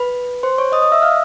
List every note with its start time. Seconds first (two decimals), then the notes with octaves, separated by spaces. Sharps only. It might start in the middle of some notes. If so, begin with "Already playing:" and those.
Already playing: B4 B5
0.43 C5 C6
0.58 C#5 C#6
0.72 D#5 D#6
0.82 D#5 D#6
0.92 E5 E6
1.02 F5 F6